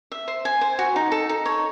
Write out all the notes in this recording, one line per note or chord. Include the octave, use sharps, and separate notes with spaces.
E5
C5
G#5
C5
F#4
D#4
A4
D#4
C#5